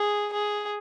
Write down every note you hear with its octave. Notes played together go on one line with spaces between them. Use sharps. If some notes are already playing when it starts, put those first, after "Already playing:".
Already playing: G#4
G#4